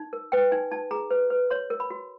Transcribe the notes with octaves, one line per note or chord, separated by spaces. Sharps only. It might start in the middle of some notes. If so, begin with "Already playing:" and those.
Already playing: D#4
A#4
B4 G5
D#4 G#5
D#4 A5
G#4 A#5
B4
B4
C#5 C6
A#4
B5
F#4